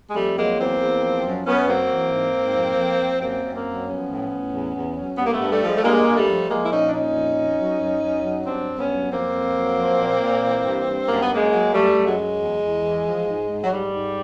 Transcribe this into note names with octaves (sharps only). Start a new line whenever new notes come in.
G#3
F2 G3 A3
F#3 G#3 A#3
E2 A#3 C4
E2
F3
F#2
F#2 B3 C#4
F#3 A#3 C4
E3
G#2
G#2
F2
F2
F3
F#2 A#3 C4
F#2
A#3 C4
F#3
F3 B3 C#4
A2
A2
E2
E2
F#3
G2 B3
A#3
A3 B3
G2
G3 A3
F3
G#3
A3
G2 G#3 A#3
G2
G3 A3
F3
F3 G#3 A#3
E4
A#2 C#4 D#4
D4
A#2 C#4 D#4
F2
F2
F#3
F#2
F#2
F#3
G2 C4 D4
G2
B3 C#4
F#3
F2 A#3 C4
F2
F#3
F3
A#2
A#2
E3
G2
G2
F#2 A#3
B3
F#2 G#3 A#3
F#3
F#2 G3 A3
F#2
F#3 G#3
F#3
E2
E2
E3
F3
G#2
G#2
F#3
G#2 G3
G#2